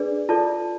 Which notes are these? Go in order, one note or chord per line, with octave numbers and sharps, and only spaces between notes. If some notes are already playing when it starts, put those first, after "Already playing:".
Already playing: D4 G#4 B4 D5
F4 A4 D5 A5